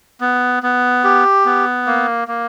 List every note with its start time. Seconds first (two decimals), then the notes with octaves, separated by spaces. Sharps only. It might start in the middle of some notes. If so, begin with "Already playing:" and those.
0.21 B3
0.63 B3
1.04 G4
1.45 B3
1.87 A#3
2.28 A#3